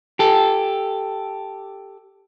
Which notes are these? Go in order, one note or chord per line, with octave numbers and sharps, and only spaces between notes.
G4 A4